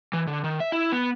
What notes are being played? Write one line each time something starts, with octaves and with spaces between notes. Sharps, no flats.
E3
D3
D#3
E5
E4
B3